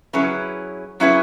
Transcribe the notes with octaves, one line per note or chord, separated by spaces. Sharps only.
F#3 C#4 E4 G#4 B4
F#3 C#4 E4 G#4 B4